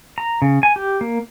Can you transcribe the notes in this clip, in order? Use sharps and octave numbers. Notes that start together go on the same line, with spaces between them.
A#5
C#3
G#5
G4
A#3